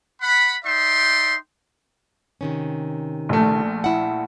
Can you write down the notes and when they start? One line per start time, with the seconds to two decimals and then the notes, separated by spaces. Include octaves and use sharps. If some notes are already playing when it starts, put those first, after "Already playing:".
0.21 F#5 B5
0.65 D#4 D5 E5 G5 C6
2.41 C3 D#3 C#4
3.29 A#1 A3
3.84 E4 F#5